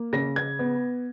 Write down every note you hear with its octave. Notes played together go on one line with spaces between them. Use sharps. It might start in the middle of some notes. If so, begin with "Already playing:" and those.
Already playing: A#3
C#3 A#6
G#6
B3